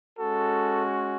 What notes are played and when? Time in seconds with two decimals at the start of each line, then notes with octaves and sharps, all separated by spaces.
0.17 G#3 C#4 F#4 A4